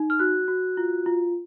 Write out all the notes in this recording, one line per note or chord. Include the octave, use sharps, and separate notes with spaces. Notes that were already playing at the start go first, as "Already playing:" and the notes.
Already playing: D#4
F6
F#4 F#6
F#4
F4
F4